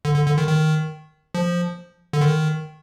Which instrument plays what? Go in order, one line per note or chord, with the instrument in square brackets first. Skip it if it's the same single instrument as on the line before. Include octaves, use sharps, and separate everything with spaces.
[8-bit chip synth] D3
D3
D3
D#3
D#3
F3
D3
D#3